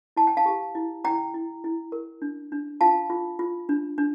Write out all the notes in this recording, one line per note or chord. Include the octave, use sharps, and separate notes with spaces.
E4 A5
G5
F5 A5
G4
E4
E4 G5 A#5
E4
E4
A#4
D4
D4
F4 F5 A5
F4
F4
D4
D4